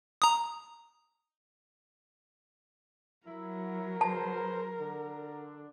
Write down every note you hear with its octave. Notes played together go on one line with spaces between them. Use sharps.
A#5 D#6
F#3 E4 A#4
G#4 B4 C5 A5
D3 D4